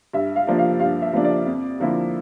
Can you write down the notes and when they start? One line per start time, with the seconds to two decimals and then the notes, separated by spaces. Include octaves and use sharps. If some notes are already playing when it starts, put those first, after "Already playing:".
0.13 G2 E5
0.36 F5
0.47 F3 A#3 D4
0.59 F5
0.80 G2 F5
1.02 E5
1.13 F3 A#3 D4
1.24 D5
1.46 F2
1.80 D3 F3 A#3 E4